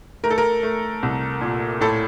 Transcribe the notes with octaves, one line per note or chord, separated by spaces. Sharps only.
A3 A#4
A4
A#4
A3
C2
A#2
A2 A4